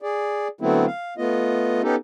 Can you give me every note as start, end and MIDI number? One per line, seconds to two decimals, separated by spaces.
0.02 0.48 68
0.02 0.48 74
0.61 0.86 50
0.61 0.86 54
0.61 0.86 57
0.61 0.86 59
0.61 0.86 60
0.61 0.86 64
0.87 1.14 77
1.18 1.82 57
1.18 1.82 59
1.18 1.82 65
1.18 1.82 75
1.83 1.95 59
1.83 1.95 61
1.83 1.95 63
1.83 1.95 67
1.83 1.95 69